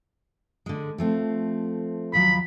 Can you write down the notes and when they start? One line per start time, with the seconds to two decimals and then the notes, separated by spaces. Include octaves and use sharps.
0.66 D3 G#3
0.98 F3 A3 C4
2.13 D#2 F3 F#3 B5